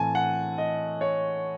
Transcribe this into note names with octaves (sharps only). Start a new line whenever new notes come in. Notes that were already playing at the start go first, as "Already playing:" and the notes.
Already playing: A2 E3 C4 G#5 A5
F#5
D#5
C#5